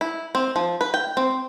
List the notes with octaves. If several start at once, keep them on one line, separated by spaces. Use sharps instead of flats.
E4
C4
F3
B4
G5
C4